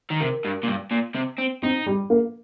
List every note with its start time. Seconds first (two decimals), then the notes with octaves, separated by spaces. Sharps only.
0.10 D#3
0.20 C3 A#4
0.45 G2
0.63 A#2
0.68 G2
0.91 A#2
1.15 C3
1.38 C4
1.63 C4 D#4
1.86 G3
2.10 A#3